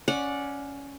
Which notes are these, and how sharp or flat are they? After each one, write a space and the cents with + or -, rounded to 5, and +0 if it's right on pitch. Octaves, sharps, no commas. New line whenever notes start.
C#4 +10 D5 +0 F#5 -15